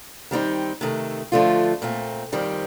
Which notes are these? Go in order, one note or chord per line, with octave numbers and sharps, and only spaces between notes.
D#3 G3 C4 D#4
C3 D#3 A3
D3 F3 A3 D4 F4
A#2 A3 C4
F2 D#3 G3 C4